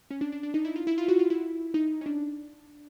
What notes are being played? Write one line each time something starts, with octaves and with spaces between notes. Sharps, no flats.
C#4
D4
D4
D4
D#4
E4
F4
E4
F4
F#4
F4
E4
D#4
C#4
D4